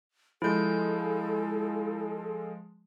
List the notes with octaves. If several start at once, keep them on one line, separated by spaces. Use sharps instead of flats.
F3 G#3 E4 A4 G6